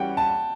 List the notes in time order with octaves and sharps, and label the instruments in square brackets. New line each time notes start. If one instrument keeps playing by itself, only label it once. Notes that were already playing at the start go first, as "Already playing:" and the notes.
Already playing: [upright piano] E3 G3 C#4 F#4 [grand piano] F#5 G5
[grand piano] A5